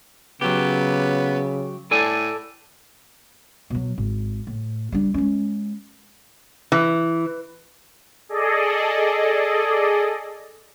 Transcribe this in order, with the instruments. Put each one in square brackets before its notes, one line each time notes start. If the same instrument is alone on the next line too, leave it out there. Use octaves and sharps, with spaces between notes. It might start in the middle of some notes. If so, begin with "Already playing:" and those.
[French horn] C#3 [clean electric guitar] F#3 G4 [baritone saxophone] B3
[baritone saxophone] A2 [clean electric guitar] A4 D5 G#5
[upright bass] B2 F#3
G#1
A2
G3 D4
G#3 C#4
[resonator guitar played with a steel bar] E3
[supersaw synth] G#4 A4 D5 D#5